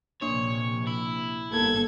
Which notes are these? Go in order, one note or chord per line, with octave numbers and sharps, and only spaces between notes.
A#1 C3 A#3 D4 C#5
E4
G1 G#2 A#3 A4 G#6